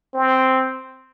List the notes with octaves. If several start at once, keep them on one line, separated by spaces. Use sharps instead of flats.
C4